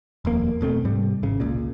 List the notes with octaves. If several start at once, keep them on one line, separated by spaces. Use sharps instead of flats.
D#1 F2 A#3
E1 B2 A3 C4
G#2 C3 G3
G#1 C#3
C#2 A#2